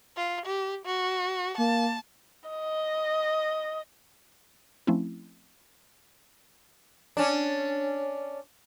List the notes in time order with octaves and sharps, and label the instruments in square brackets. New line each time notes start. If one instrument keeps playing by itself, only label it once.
[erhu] F4
G4
F#4
[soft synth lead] A#3 [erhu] A5
[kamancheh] D#5
[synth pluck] F3 A3 C4 C#4 E4
[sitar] C#4 D4